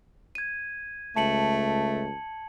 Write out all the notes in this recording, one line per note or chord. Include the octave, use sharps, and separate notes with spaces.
G#6 D#7
C#2 A3 A5 C#7 F#7